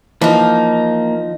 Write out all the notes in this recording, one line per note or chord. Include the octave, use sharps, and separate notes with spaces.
E3 F3 A#3 D#4